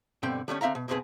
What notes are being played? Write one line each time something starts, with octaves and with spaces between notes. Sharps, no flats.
G2 B2 D3 C4 G5
D3 G3 A3 C#4
D3 C4 E5 F5 A#5
B2
B1 F2 B2 C4 G#4 B4